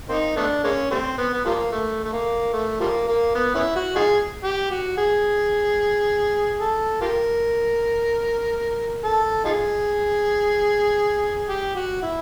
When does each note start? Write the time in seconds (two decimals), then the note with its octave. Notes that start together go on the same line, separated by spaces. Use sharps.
0.09 A#3 C4 D#4
0.36 A3 B3 D4
0.64 G#3 A#3 C#4
0.91 G3 A3 C4
1.18 B3
1.33 B3
1.45 F3 G3 A#3
1.72 A3
2.04 A3
2.13 A#3
2.53 A3
2.80 F3 G3 A#3
3.08 A#3
3.35 B3
3.55 B3 C#4 E4
3.76 F#4
3.96 D#4 F4 G#4
4.43 G4
4.71 F#4
4.98 G#4
6.60 A4
7.01 F4 G4 A#4
9.04 A4
9.45 D#4 F4 G#4
11.49 G4
11.75 F#4
12.02 E4